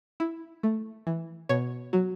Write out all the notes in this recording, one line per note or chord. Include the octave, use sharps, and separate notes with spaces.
E4
A3
E3
B2 C#5
F#3